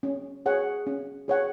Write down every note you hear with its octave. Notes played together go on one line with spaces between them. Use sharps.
C#4
G#4 C#5 F#5
C#4
G#4 C#5 F#5